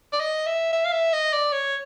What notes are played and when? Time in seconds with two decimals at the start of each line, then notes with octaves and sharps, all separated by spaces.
0.13 D5
0.20 D#5
0.47 E5
0.73 E5
0.85 F5
0.92 E5
1.13 D#5
1.33 D5
1.52 C#5